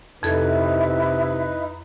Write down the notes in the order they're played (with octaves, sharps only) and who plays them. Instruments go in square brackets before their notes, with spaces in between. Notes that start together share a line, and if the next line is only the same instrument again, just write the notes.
[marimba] F2 A4 G#6 [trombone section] C3 [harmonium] D#4 B4 [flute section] E4